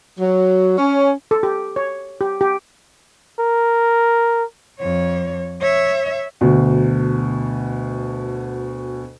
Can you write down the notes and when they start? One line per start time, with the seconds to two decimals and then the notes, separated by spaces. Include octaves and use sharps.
0.19 F#3
0.78 C#4
1.31 A4
1.43 G4
1.76 C#5
2.21 G4
2.41 G4
3.40 A#4
4.80 F2 C#5
5.62 C#5 E5
6.41 D2 B2